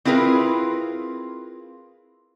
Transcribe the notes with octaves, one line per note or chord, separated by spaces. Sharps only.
C4 E4 F4 G#4 A#4 B4